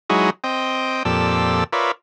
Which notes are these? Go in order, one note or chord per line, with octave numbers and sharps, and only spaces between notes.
F#3 G#3 D#4 E4 F#4 G#4
C4 D#5 G5
F2 A#2 G4 A4 D5 E6
F4 A#4 B4 C#5 D5 E5